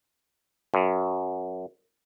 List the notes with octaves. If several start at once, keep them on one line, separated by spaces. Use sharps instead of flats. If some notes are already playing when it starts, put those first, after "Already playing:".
F#2